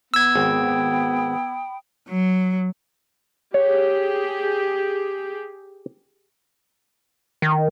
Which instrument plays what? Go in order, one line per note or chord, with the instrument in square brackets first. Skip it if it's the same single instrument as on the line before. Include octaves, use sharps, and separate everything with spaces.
[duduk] B3 [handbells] E6 G#6
[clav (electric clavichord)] G#1 [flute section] G5 B5 D#6
[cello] F#3
[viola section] G4 G#4 [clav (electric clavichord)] C#5
[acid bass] D#3